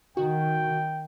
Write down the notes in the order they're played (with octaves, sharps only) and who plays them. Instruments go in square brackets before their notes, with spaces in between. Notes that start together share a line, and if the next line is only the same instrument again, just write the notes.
[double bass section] D#3 [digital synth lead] F#4 [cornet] G5